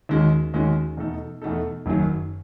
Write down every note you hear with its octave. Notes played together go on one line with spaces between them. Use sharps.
D#2 D#3 G#3 C#4 F#4
D#2 D#3 G#3 C#4 F#4
E2 B2 A3 D#4 A4
E2 B2 A3 D#4 A4
F#1 F#2 D#3 F#3